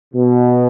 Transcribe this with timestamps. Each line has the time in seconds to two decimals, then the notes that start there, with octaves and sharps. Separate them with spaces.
0.14 B2